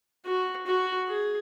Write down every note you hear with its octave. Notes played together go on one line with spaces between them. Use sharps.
F#4
F#4
G#4